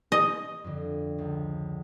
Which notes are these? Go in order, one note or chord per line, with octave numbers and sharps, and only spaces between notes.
D#5
F2 D3
C#2